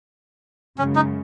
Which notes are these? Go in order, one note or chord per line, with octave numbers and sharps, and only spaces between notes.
F#2 C#3 G#3 C#4
D#4